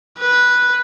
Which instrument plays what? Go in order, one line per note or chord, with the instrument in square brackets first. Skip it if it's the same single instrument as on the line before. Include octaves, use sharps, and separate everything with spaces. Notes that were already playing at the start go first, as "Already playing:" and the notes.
[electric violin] B4